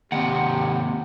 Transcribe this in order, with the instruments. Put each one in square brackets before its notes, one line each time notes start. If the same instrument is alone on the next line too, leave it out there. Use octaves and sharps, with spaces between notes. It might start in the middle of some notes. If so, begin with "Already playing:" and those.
[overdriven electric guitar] D#2 C3 [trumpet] G4 [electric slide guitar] F#5